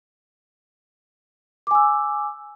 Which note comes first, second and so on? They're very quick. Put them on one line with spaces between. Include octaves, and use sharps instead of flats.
D6 G#5 E6